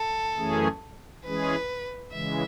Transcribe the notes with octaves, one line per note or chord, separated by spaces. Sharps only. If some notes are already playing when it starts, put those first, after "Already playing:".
Already playing: A4
F#2 E3 A3 C#4 G#4
E3 G#3 C#4 G#4 B4
C#3 E3 G#3 E5